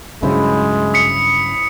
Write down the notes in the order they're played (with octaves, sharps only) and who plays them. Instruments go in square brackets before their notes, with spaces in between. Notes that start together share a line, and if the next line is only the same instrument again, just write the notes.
[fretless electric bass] G2 C#3 F#3 [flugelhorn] G#3 [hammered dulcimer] E4 C5
[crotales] D#6 B6 C#7